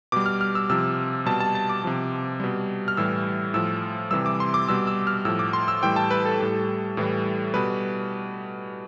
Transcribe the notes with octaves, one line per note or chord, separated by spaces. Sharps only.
B2 G3 D6
F6
F6
E6
C3 F3 E6
B2 G3 A5
A5
A5
D6
C3 F3
B2 G3
F6
A2 E3 G3 E6
A2 F3 E6
C3 E3 G3 E6
D6
C6
D6
B2 G3 E6
E6
F6
A2 F3 E6
D6
C6
E6
A2 E3 G3 G5
A5
B4
A4
A2 G3
A2 E3 G3
B2 G3 B4